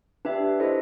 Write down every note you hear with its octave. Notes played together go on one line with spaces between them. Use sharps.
D4 G4 B4 E5
E4 A4 C5 D#5